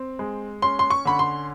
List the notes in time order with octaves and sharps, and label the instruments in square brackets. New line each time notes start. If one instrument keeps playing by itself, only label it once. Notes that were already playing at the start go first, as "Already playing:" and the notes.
Already playing: [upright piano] C4
G#3
C#4 C6
C6
C#6
D3 B5
C6